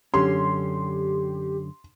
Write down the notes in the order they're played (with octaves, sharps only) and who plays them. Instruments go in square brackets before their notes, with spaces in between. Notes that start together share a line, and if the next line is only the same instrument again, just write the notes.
[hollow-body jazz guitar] F#2 D3 C#4 [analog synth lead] G4 [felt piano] C6